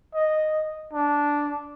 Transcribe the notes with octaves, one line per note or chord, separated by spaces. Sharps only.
D#5
D4